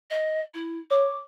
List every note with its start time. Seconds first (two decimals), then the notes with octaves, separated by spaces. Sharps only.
0.10 D#5
0.54 E4
0.91 C#5 D6